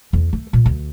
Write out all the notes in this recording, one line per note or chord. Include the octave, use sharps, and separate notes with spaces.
E2
A3
A#2
D2